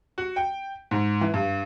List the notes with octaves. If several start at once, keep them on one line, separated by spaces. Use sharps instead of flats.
F#4
G5
G#2
E3
G2